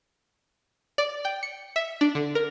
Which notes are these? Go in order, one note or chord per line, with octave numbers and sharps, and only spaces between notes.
D5
G5
C#7
E5
D4
D3
A#4